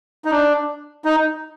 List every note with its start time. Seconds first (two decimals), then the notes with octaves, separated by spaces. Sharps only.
0.25 D#4
0.31 D4
1.05 D#4